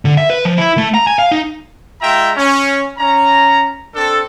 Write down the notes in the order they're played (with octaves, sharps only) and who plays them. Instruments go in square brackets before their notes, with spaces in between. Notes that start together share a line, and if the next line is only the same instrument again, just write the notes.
[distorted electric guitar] D3
E5
B4
F3
E4
A3
A#5
G#5
F5
D#4
[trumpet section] G#3 F4 E5 G5 A#5
C#4
C#4 A#5
C4 D4 A4